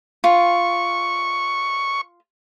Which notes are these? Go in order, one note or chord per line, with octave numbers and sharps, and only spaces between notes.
F4 C#6